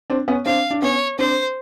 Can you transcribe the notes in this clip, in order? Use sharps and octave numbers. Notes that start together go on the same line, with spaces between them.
C4 D4
B3 C#4
C4 D4 F5
D4
B3 C#4 C#5
C4 D4 C5